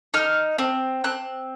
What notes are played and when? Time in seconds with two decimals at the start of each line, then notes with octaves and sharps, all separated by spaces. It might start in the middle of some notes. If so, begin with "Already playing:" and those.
0.14 D#4 F6
0.58 C4
1.04 C4 F#6